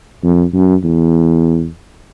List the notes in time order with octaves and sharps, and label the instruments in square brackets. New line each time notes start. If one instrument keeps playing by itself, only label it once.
[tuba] F2
F#2
E2